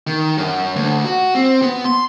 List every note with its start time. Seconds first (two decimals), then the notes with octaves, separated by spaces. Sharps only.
0.07 D#3
0.37 F#2
0.76 D2
1.05 F#4
1.35 C4
1.62 B3
1.85 C6